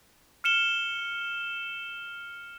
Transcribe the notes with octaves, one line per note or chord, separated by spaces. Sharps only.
F6 C#7 E7 G7